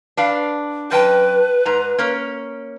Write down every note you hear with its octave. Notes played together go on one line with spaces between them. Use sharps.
D4 B4 F5
F#2 B4 G5 A5
G#2 A#5
A#3 C#4